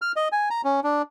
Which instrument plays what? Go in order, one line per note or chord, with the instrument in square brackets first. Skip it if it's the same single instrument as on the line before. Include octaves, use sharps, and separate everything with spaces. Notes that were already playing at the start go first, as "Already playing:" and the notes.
[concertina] F6
D#5
G#5
A#5
C#4
D4